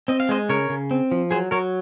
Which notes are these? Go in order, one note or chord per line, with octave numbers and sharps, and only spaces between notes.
C4 D#5
F5
G#3 C5 D#5
C#3 A#4 C#5
C#3
C4
F3
F#3 G#4 C5
F#3 A#4 C#5